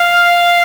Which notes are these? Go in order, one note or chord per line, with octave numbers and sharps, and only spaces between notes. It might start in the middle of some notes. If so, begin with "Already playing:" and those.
Already playing: F5